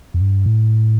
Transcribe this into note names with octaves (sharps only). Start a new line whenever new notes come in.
F2
G2
A2